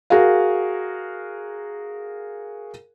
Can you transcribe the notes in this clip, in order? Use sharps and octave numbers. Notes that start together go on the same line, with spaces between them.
F#4 G#4 A#4 F5